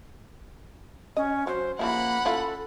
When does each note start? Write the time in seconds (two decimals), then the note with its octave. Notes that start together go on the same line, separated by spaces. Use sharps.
1.17 C#4 D#5
1.47 F#3 C5
1.79 C#3 F3 A#3 E4 F#5 B5
2.25 C#4 E4 F4 A4